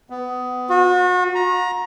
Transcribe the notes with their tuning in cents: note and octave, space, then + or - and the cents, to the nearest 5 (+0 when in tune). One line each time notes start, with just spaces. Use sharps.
B3 +20
F#4 -35
A#5 +20